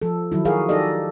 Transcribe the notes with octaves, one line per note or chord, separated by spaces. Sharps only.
F3 A4
D#3 F#3 E4
F4 F#4 G#4 A#4 F5
D#4 G4 A4 D5 D#5